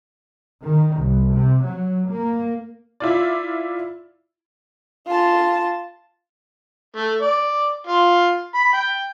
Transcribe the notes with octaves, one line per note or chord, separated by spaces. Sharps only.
D#3
C2
C3
F#3
A#3
E4 F4 D5
F4 A5
A3
D5
F4
B5
G5